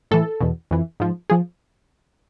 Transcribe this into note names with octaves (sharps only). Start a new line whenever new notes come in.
A2 E3 A4
E2 B2
F2 E3
G#2 F3
F3 G#4